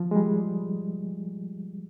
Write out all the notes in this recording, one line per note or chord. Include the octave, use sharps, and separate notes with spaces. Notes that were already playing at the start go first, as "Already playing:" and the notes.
Already playing: F3
G#3
G3